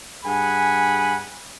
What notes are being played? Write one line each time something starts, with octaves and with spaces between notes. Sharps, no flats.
G2 G#4 F#5 G#5 B5